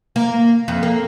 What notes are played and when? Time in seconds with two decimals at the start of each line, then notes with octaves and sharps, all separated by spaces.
0.16 A#3
0.68 F2
0.83 A#3